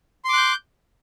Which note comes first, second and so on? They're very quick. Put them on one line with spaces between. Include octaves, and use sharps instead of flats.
C6 D6 F#6 G6